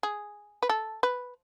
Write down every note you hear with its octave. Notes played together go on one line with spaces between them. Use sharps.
G#4
B4
A4
B4